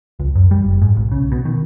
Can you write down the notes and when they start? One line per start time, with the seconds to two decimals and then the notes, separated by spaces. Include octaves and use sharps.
0.20 C#2
0.35 F#2
0.51 G3
0.64 F#1
0.82 G#2
0.97 B1
1.12 C#3
1.32 B2
1.45 D#3